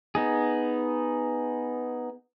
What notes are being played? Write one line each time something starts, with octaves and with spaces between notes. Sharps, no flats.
B3 D#4 G#4